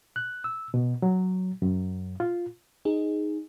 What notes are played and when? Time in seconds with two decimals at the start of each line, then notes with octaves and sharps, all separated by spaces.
0.16 F#6
0.44 E6
0.74 B2
1.02 F#3
1.62 F#2
2.20 F4
2.85 D#4 G#4